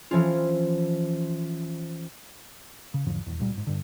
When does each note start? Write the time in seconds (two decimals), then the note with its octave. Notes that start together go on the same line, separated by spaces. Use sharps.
0.11 E3 F3 C#4 F4
2.94 C#3
3.06 E2 G#2 D3 F3
3.26 D#1 E2
3.39 C#2 A#2 G3
3.54 G1 G#2
3.67 G2 D3